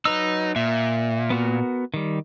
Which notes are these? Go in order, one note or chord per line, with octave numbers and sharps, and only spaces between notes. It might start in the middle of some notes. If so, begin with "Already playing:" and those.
F#3 D#4 B4 E6
A#2 E5
B3 F#4 A#4
D#3 G3